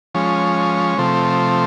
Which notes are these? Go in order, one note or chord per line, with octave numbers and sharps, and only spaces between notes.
F3 G#3 C#4
C3 F3 A3 C4